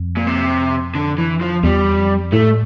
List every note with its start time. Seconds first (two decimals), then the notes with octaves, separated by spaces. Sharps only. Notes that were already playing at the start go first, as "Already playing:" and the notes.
Already playing: F2
0.17 A#2
0.27 C3
0.95 D3
1.18 E3
1.41 F3
1.64 E2 G3
1.98 F2
2.32 A2 A3